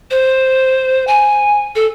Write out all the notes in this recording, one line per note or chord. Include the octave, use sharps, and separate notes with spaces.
C5
G#5
A4